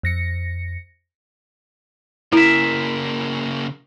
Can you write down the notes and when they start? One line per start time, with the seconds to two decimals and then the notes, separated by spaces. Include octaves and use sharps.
0.03 F2 A#6 C#7
2.33 C#3 A#3 E4 A#4 E5